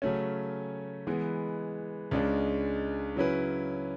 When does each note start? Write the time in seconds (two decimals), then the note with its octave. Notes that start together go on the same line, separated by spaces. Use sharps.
0.02 C#3 F#3 A3 C#4
1.07 E3 G#3 B3
2.11 C#2 C#3 G#3 D4
3.16 C#3 F#3 C#4 E4 B4